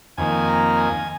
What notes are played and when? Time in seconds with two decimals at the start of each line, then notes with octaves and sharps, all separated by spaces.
0.17 F2 D#3 A#3 G#5
0.48 A#5
0.77 G#5